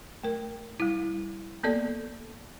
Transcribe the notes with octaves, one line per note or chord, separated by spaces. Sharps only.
A3 A#4
G3 E4
A#3 B3 A4 D5